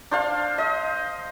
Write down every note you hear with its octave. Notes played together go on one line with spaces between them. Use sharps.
D4 C5 F5
D#5